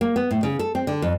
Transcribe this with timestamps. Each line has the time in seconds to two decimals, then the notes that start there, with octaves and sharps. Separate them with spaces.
0.01 A#3
0.16 B3
0.31 A2
0.43 C#3
0.59 A4
0.75 C4
0.87 D3
1.02 F2